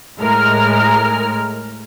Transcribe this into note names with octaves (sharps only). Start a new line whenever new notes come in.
A2 G#3 A#4 F6